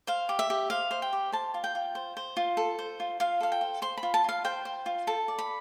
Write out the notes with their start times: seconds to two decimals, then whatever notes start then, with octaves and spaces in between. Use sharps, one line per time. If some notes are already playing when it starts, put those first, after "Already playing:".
0.07 C5 F5
0.29 G4
0.39 E5
0.50 G4
0.70 C5 F5
0.91 C5
1.02 G5
1.13 G4
1.32 C5 A5
1.54 F4
1.64 G5
1.75 F4
1.95 C5
2.17 C5
2.37 F4
2.57 A4
2.79 C5
3.00 F4
3.20 F4 F5
3.41 A4 F5
3.52 G5
3.61 C5
3.82 C5 C6
3.97 B5
4.03 F4
4.14 A5
4.24 F4 F5
4.44 C5 G5
4.65 C5
4.86 F4
5.07 A4 A5
5.28 D5
5.39 B5